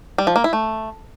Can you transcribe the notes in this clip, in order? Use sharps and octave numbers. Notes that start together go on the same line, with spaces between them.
G3
F3
A#3
E4
A3